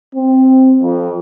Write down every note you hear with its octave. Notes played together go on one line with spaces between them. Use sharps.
C4
F2